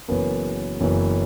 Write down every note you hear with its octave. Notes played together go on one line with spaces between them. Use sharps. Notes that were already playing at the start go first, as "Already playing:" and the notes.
F#1 F#2 E3 B3
F#1 F#2 E3 B3